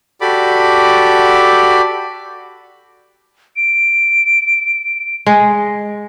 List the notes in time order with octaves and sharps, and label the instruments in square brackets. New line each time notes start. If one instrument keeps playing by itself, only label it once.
[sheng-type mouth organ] F#4 G4 A4 D5 B5 D6
[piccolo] D7
[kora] G#3